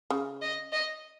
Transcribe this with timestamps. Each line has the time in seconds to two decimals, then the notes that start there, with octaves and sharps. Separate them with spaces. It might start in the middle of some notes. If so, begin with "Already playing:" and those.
0.10 C#3
0.42 D#5
0.72 D#5